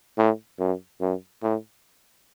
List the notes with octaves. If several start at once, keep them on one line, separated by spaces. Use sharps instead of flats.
A2
F#2
F#2
A2